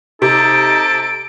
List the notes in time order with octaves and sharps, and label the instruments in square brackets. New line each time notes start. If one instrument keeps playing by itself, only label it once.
[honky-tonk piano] C3 [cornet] D#4 [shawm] A4 [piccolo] D7